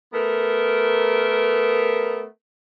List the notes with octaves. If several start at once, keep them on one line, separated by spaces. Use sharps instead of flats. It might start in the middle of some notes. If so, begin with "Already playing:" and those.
A3 B3 A#4